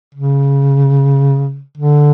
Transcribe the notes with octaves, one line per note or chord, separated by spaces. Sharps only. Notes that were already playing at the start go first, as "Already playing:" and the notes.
C#3
D3